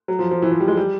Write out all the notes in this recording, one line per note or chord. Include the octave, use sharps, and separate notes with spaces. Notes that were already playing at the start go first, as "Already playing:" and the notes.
F#3
F3
F3
E3
F3
G3
G#3
G3